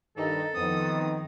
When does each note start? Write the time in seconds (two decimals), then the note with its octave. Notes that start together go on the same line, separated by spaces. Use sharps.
0.17 G2 D#3 D#4 A4
0.55 F2 D#3 B3 C4 D#4 D#6